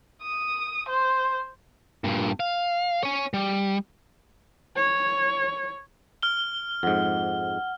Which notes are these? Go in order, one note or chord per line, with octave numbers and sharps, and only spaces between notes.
D#6
C5
G2 A#2
F5
C#5 G#5
G3
C#5
F6 G7
F2 G#2 F#5